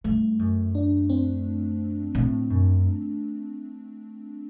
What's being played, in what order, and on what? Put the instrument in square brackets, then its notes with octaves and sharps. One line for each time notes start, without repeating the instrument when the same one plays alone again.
[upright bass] G2 [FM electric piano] A3
[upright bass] F#2
[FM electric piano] D4
C4
[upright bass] A2
F#2